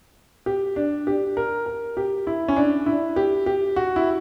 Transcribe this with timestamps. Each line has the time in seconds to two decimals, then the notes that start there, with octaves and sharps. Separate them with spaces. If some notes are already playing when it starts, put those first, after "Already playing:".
0.46 G4
0.76 D4
1.07 G4
1.37 A#4
1.66 A#4
1.97 G4
2.27 E4
2.48 C#4
2.57 D4
2.86 E4
3.16 G4
3.46 G4
3.76 F#4
3.96 E4